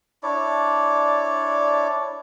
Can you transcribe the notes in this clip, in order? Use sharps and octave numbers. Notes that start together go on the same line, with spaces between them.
D4 E4 C#5 D5